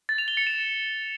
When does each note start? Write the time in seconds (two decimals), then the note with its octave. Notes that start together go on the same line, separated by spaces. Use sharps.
0.09 A6
0.18 F7
0.28 G7
0.37 C#7
0.47 E7